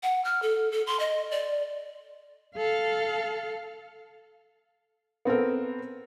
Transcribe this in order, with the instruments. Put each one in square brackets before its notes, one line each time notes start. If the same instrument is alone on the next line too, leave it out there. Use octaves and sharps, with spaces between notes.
[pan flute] F#5
F6
A4
A4
C6
D#5
D5
[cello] A4 F5
[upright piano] B3 C4 A4 A#4